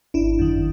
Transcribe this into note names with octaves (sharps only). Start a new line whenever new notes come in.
G#1 D4 E4
F#2 D#3